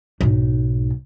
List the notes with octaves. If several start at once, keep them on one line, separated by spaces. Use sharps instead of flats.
B1 G#2